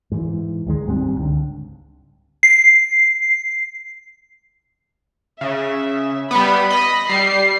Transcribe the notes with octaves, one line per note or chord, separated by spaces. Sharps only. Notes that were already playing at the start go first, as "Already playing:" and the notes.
G#2 E3
D2 D#3 G3 G#3
F#1 G#2 G3 C4
C#2 D3
C7
C#3 E5
G3 B3 B5
D#5
G3 C7